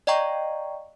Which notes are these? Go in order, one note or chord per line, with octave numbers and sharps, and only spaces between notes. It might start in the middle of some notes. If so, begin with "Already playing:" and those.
D5 D#5 F5 G5 A#5 C#6